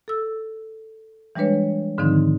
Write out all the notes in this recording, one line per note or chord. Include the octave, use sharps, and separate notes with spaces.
A4 E6
E3 G3 G#3 D4 B4 C#5
G#2 D3 D#3 F3 C4 D#4